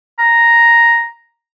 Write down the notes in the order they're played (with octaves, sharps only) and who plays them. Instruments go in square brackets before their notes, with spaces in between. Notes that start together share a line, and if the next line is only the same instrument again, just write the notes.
[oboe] A#5